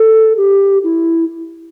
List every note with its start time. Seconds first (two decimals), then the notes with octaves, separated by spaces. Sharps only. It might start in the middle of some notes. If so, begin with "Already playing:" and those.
Already playing: A4
0.37 G4
0.84 E4